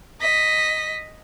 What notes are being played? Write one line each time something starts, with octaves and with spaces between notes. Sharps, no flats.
D#5 B6